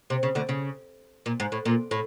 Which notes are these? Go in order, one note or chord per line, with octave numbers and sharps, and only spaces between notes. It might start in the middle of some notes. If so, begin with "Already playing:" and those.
C3
C#3
D2 D3
C#3
A#2
G#2
A2
A#2
A2